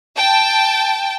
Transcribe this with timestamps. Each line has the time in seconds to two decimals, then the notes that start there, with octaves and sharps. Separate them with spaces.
0.15 G5 A5